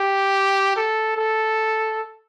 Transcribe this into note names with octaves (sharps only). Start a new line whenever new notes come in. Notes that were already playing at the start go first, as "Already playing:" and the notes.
Already playing: G4
A4
A4